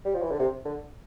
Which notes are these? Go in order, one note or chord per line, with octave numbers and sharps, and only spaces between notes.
G3
F3
E3
D3
C3
D3